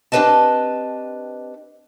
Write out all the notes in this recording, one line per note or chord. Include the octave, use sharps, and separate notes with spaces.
C4 D4 G4 B4 D#5 A5